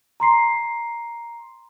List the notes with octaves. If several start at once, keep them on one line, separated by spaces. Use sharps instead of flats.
A#5 C6 C7